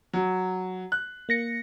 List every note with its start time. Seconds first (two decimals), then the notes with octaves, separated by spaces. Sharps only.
0.13 F#3
0.92 F#6
1.29 A#3 A#6 C#7